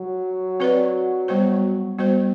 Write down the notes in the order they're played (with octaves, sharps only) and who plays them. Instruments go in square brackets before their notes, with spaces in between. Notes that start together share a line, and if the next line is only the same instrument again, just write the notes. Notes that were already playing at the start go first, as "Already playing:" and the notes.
Already playing: [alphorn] F#3
[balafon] C4 F#4 B4 D5
G3 B3 F#4 C5
G3 B3 F#4 C5